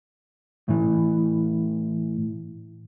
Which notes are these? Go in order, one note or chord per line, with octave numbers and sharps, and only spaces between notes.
A2 E3